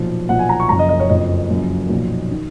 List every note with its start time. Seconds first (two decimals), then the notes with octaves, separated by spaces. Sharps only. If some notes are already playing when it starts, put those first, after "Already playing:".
Already playing: B1 A#2 F3
0.29 B1 A#2 F3 F#5
0.39 G#5
0.49 A#5
0.60 C#6
0.69 F#1 F#2 F3 A#5
0.79 D#5
0.89 D#5
1.00 C#5
1.09 F#1 F2 F3 D#5
1.50 F#1 F#2 F3
1.89 B1 A#2 F3
2.31 D#3